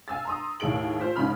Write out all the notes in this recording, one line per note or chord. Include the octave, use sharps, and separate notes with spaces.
F5 G#5 E6 A6
A#5 C6 D#6
D#2 A2 G#4 D7 F#7
F4 C5 B6
A#1 G#2 C#3 B5 F6